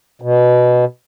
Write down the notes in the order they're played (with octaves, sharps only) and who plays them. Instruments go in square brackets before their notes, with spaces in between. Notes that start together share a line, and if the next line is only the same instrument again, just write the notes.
[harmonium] B2